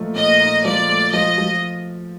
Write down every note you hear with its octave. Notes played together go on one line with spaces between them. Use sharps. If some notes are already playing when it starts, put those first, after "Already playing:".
Already playing: A#2 F3 A3 D#4
A#2 D#5
D#4
F3 D5
A3
F3 D#5
F3